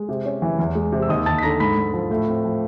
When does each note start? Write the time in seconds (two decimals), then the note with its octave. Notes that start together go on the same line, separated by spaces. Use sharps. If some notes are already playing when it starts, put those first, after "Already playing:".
Already playing: G#3
0.09 C3
0.25 C#4
0.42 E3
0.59 E2
0.75 G#3
0.92 C3
1.02 E6
1.09 D#2 D#5 D#6
1.26 D#2 A5 A6
1.38 B6
1.42 D3 A#5 A#6
1.60 G#2 B5 B6
1.77 G#2
1.93 F3
2.11 A2
2.28 C4
2.44 F3